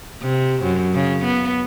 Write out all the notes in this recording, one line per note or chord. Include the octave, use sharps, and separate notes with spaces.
C3
F#2
C#3
B3